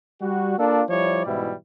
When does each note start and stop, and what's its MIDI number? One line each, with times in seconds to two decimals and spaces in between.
0.21 0.55 55
0.21 0.55 66
0.59 0.83 58
0.59 0.83 62
0.59 0.83 65
0.59 0.83 69
0.59 0.83 74
0.89 1.23 53
0.89 1.23 55
0.89 1.23 64
0.89 1.23 73
0.89 1.23 74
1.26 1.53 44
1.26 1.53 47
1.26 1.53 52
1.26 1.53 55
1.26 1.53 64